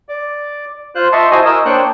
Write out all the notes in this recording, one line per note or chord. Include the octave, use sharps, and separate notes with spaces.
D5
F4 C5 F#6
D#5 E5 A5 C6 C#6
E4 F#4 C5 D#5 G#5
A#4 D#5 D#6 E6
A#3 D4 C5 C#5 G5 F#6